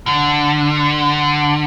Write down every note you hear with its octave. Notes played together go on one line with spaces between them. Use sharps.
D3